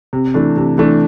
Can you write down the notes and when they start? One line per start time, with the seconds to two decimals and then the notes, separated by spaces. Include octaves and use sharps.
0.13 C3
0.34 E3 A3 D4
0.56 C3
0.78 E3 A3 D4